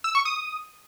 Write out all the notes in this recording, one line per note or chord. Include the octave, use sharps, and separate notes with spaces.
E6
C#6
D#6